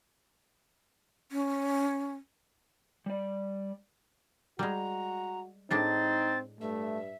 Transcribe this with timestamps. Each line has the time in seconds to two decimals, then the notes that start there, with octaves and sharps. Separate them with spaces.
1.32 C#4
3.06 G3 D5
4.59 G3 G#3 F#4 A#5
5.71 A2 G#3 C4 D4 D#4 A6
6.61 G2 A3 E5